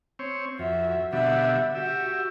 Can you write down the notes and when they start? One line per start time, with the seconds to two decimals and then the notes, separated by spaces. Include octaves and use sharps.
0.19 C4 C#5
0.59 F2 F#4 E5
1.13 B2 D3 G3 E5 F#5
1.75 F#4 G4 E5